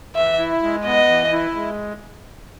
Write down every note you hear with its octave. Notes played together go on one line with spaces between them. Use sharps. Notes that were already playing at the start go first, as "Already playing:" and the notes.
E3 E5
E4
G#3
B3 D#5
E3
E4
G#3